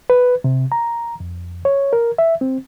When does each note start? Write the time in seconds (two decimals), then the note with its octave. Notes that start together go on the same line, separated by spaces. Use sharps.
0.10 B4
0.44 C3
0.72 A#5
1.20 F2
1.65 C#5
1.93 A#4
2.18 E5
2.41 C4